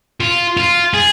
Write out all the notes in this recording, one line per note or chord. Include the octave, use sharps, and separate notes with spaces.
F4
F4
G#4